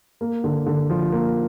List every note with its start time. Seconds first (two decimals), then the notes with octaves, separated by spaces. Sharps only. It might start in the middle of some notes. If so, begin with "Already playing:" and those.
0.21 A#3
0.44 D3
0.66 D3
0.90 F3
1.12 A#3